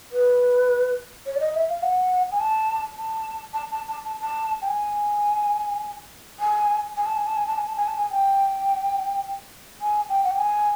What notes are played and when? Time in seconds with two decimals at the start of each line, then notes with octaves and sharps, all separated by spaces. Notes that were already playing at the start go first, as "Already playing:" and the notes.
0.12 B4
1.26 C#5
1.35 D5
1.40 D#5
1.54 E5
1.69 F5
1.83 F#5
2.32 G#5
2.40 A5
2.97 A5
3.54 A5
3.71 A5
3.88 A5
4.05 A5
4.21 A5
4.62 G5
4.68 G#5
6.40 G#5
6.97 G#5
7.06 A5
7.17 G#5
7.27 A5
7.36 G#5
7.47 A5
7.58 G#5
7.67 A5
7.77 G#5
7.87 A5
7.97 G#5
8.11 G5
9.81 G#5
10.09 G5
10.24 F#5
10.31 G5
10.38 G#5